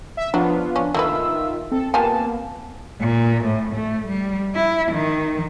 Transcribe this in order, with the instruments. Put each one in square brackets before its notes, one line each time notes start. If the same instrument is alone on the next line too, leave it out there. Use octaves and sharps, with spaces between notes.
[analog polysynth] E5
[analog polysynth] F3 B3 F4 [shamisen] F#3 [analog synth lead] D4
[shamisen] C#4 [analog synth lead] D4
[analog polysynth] D#3 F4 E5 [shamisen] A3 A#3 B4 [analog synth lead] E6
[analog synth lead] C4 [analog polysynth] A4
[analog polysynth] A#3 B3 [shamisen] F4 G4 G#5 [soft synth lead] A5
[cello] A#2
A2
A3
G3
E4
D#3